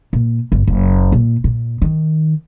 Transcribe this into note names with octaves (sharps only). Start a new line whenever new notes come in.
A#2
G1
F#1
A#2
A#2
D#3